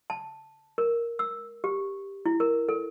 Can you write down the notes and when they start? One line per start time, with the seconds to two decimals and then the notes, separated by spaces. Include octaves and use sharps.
0.10 A5
0.78 A#4
1.19 E6
1.64 G4
2.26 E4
2.40 A#4
2.69 A4